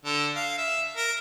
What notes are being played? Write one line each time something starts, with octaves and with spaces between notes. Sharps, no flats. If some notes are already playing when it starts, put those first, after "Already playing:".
D3
F5
E5
A#4